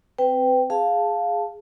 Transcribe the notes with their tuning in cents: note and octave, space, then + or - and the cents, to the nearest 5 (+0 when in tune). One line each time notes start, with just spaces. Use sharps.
C4 -10 B4 +30 G5 +0
G#4 +0 F5 +5 A5 +0